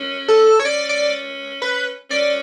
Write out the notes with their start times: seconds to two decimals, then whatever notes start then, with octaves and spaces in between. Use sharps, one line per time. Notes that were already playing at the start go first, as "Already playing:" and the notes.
Already playing: C#4
0.28 A4
0.60 C#5
0.65 C#4 D5
0.89 D5
1.62 B4
2.10 C#4 D5